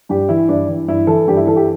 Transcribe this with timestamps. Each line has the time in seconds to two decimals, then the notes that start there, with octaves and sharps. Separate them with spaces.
0.09 G2 G4
0.29 E3 E4
0.48 G2 D4
0.68 E3
0.88 G2 E4
1.07 E3 A4
1.27 G2 G4
1.37 E4
1.47 E3 A4
1.56 G4